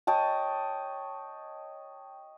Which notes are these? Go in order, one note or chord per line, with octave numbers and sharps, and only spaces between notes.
C#5 D#5 G5 A5